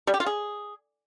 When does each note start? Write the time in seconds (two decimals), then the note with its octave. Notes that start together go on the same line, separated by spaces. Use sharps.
0.07 G3
0.14 G4
0.20 F4
0.26 G#4